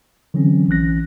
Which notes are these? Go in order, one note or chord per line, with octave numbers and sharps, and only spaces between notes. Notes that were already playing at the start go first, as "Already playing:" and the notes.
D3 E3 F#3 C4 C#4
A#1 E3 C#4 F#6 A#6